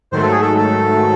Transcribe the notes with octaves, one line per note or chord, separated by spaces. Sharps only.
G#2 D#3 F#3 A3 C5
A4
G#4
A4
A4